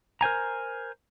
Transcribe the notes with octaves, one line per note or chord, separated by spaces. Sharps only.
A#4 C5 G#5 A#5